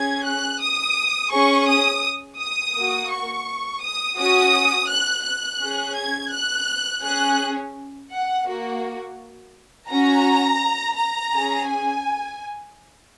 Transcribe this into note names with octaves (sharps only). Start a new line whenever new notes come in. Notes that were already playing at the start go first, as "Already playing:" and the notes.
Already playing: C#4 G#4 G#6
F#6
D#6
C#4 G#4 C#6
D#6
D#6
A#3 F#4
C#6
D#6
C#4 F#4 D#6
F#6
F#6
C#4 G#4
G#6
F#6
C#4 G#4 F#6
F#5
A#3 F#4
C#4 F#4 A#5
A#5
C#4 G#4
G#5